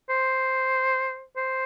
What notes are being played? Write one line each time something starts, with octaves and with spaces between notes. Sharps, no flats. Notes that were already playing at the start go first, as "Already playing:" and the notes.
C5
C5